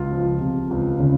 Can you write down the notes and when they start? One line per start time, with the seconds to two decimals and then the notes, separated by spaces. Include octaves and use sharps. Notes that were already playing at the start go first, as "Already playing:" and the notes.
Already playing: C#2 F4
0.12 F3
0.41 C3
0.70 C#2
1.00 C#3